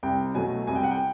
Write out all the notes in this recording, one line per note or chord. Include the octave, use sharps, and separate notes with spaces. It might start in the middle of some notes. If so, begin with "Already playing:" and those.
C2 G5
B2 F#3 A3 G#5
C2 G#5
G5
F#5
G5